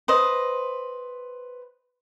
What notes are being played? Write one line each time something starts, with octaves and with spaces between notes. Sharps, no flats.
B4 C5 D#5